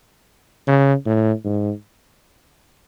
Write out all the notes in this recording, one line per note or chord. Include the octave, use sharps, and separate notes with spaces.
C#3
A2
G#2